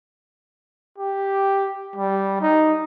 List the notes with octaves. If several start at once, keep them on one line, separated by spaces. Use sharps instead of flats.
G4
G3
D#4